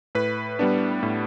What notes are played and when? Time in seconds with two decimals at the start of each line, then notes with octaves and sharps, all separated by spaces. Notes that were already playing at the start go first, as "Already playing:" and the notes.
0.15 A2 B4
0.59 G3 B3 D4
1.03 A2